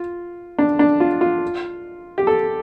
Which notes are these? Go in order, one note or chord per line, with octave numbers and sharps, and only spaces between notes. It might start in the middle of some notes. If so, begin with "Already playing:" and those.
Already playing: F4
D4
D4
F4
F4
G4
A4